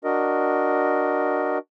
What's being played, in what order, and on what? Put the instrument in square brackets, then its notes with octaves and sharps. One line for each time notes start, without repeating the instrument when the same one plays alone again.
[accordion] D4 F#4 A#4 D#5